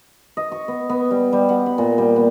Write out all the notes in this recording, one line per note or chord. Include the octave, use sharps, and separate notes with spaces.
D#5
C#6
B3
B3
G3
G3
F#5
B5
A#2
G3
B3